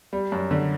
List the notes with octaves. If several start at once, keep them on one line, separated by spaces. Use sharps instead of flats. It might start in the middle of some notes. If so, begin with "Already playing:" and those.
G3
F#2
D3